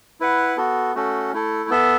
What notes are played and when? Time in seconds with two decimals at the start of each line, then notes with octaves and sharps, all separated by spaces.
0.20 E4 B4 F#5
0.57 B3 F#4 A4
0.95 A3 C#4 F#4 A4
1.33 A3 E4 A4
1.70 B3 A4 E5